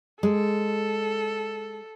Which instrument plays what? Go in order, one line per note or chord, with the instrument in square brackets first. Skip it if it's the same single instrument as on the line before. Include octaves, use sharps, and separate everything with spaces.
[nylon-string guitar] G#3 [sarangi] A4